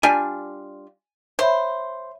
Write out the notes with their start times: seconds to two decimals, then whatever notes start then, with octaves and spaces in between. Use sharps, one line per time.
0.03 G3 D4 F4 G#5
1.39 C5 C#5 E5 B5